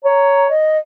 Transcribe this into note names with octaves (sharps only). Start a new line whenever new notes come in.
C#5 A#5
D#5